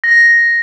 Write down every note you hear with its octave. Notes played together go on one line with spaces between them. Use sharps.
A#6